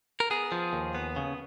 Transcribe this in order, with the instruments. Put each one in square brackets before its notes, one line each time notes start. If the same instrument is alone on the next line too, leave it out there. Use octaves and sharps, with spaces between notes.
[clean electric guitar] A#4
B3 G#4
F3
D#2
B3
C#3